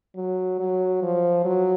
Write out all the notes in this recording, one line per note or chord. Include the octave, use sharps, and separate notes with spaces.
F#3
F#3
F3
F#3